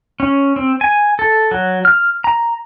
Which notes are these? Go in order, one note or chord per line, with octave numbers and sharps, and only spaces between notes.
C#4
C4
G#5
A4
F#3
F6
A#5